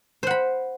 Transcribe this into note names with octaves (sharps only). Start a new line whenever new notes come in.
C5 F#5 B5